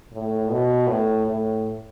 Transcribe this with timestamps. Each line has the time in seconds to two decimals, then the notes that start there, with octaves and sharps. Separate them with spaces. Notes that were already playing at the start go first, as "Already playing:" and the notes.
0.12 A2
0.50 B2
0.87 A2
1.26 A2